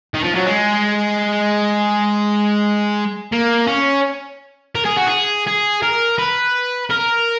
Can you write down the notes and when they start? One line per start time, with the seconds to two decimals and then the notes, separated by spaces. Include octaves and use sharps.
0.14 D#3
0.24 F3
0.35 F#3
0.46 G#3
3.33 A#3
3.67 C#4
4.75 A#4
4.85 G#4
4.96 F#4
5.07 G#4
5.47 G#4
5.82 A#4
6.18 B4
6.90 A#4